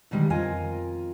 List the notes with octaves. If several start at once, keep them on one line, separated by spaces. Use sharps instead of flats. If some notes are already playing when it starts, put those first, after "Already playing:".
B2 D3 D#3 G3 G#3
F2 F4 A#4 D#5 G#5